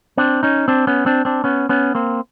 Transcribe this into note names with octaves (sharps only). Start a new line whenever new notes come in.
C4 D4
C#4 D#4
C4 D4
B3 C#4
C4 D4
C4 D4
B3 C#4
B3 C#4
A#3 C4